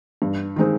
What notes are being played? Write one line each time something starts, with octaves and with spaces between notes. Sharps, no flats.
G2
D#3 G#3 C4 D#4